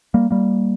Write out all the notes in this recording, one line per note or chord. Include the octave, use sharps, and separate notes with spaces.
G3 A#3
G3 A#3